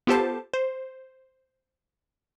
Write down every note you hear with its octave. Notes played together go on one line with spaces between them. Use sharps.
B3 F4 G4 A4 C5 A5
C5